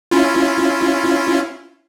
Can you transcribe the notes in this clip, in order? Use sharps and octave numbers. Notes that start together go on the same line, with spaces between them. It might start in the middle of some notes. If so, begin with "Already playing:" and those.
C#4 E4 F4